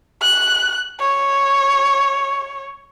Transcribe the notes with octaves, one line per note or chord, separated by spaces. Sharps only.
F#6
C#5